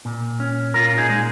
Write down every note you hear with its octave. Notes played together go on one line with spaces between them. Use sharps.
A#2
C#4
A#2 F4 A#4
D#4 G#4
G#3 G#4